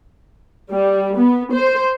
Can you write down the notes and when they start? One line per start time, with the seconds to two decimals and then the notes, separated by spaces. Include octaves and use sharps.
0.72 G3
1.17 B3
1.53 C5